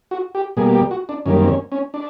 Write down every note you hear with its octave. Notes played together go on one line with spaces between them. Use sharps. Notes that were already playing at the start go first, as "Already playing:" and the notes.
F#4
G4
B2 G3 A#3 G#4
G4
F#4
D4
F#2 D#3 G3 A#3 C#4
C4
C#4
C#4
D4